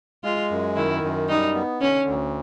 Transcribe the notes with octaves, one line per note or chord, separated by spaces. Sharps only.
G#3 F4
F#2
D#3 E4
F#2
G3 D#4
B3
D3 C#4
D2